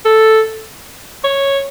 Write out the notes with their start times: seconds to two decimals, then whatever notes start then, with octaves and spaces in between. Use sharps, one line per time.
0.05 A4
1.24 C#5